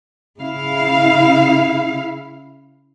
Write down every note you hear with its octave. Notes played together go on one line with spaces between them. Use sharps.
C#3 E4 F5